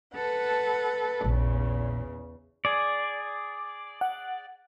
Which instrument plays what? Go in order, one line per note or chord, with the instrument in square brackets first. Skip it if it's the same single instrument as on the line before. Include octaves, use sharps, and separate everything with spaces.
[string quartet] A4 B4 F#5
[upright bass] A#1 [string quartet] E2 C#3
[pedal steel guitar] G#4 D5
[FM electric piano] F#5